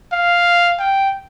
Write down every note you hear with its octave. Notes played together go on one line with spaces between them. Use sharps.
F5
G5